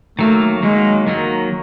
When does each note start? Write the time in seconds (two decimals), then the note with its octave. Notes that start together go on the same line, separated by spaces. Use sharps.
0.19 D#3 F#3 A3 A#3
0.63 D#3 F#3 G#3 A#3
1.07 D#3 F#3 A#3